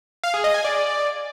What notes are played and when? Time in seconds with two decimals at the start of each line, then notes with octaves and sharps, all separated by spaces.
0.24 F5
0.34 G#4
0.44 D#5
0.54 G#5
0.64 D5